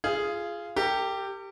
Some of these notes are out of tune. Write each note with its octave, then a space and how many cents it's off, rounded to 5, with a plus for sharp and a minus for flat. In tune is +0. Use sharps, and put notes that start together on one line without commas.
F4 -20 G#4 +0
G4 +0 A#4 -45